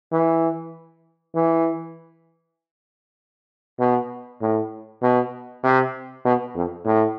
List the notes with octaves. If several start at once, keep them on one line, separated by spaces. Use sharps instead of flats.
E3
E3
B2
A2
B2
C3
B2
F2
A2